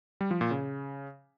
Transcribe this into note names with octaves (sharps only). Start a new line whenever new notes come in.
G3
F3
A#2
C#3